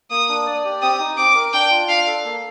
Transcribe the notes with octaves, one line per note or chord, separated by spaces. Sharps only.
A#3 D#6
D4
D5
G4
C4 D#6
D#4
C4 D6
A#4
D4 G5
F4
D4 F5
A4
A#3